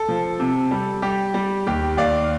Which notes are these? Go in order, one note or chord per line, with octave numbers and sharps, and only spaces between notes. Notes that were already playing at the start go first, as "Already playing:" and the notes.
Already playing: A4
F3
C3
G3
G3 G4
G3
D#2 G4
D#2 D5 F5